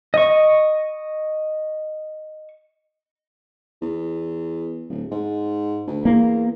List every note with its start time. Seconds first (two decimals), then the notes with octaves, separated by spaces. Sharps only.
0.14 D#5 C#6
3.82 E2
4.90 D1
5.11 G#2
5.87 D2
6.05 E2 A#3